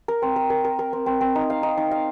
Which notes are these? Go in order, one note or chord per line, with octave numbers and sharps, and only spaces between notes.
A#4
C4
A#4
A#4
A#4
A#4
C4
C4
C4
D#4
F5
D#4
D#4
F5